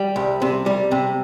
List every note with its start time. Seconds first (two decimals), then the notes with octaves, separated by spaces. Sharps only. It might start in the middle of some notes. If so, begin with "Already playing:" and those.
Already playing: G3
0.16 C2
0.42 C3
0.66 G3
0.91 C3